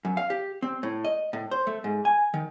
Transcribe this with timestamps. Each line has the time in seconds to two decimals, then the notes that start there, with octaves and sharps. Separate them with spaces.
0.05 F#2
0.17 F5
0.30 G4
0.62 C4
0.83 A2
1.05 D#5
1.33 A2
1.51 C5
1.67 A3
1.84 G#2
2.05 G#5
2.34 D#3